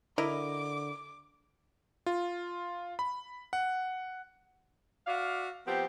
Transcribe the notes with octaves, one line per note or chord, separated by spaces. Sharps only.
D3 E4 A#4 D#5 D6
F4
B5
F#5
F#4 D5 E5 F5
F3 B3 C4 G4